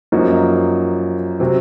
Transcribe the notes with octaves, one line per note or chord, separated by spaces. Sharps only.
F#2 F3 A#3 D#4 F#4
C3 F#3 C4